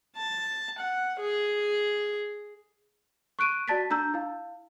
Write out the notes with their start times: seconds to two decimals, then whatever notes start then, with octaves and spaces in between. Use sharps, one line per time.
0.17 A5
0.78 F#5
1.19 G#4
3.39 C#6 F#6 D7 D#7
3.68 F#4 D5 A5 A6 B6
3.90 D4 A#5 E6 G6
4.14 E4 F5